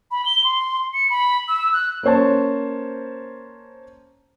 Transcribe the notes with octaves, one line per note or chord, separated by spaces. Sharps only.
B5
G7
C6
C#7
B5
E6
F#6
A#3 C#4 C5 C#5 A5